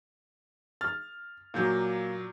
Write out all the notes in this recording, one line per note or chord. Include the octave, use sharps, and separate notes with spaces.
F6 A6
A#2 F#3 A#3 G6